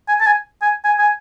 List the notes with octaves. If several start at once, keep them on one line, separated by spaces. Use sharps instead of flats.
G#5
A5
G#5
G#5
G#5
G#5